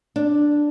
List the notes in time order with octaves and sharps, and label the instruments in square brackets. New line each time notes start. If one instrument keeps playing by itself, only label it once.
[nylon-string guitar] D4